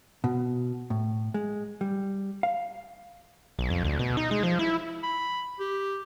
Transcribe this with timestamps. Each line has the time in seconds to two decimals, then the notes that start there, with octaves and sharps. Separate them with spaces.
0.24 B2
0.90 A2
1.34 G#3
1.81 G3
2.43 F5
3.59 B1
3.70 F2
3.85 D2
3.99 B2
4.17 D#4
4.31 G#3
4.43 F3
4.59 E4
5.03 B5
5.59 G4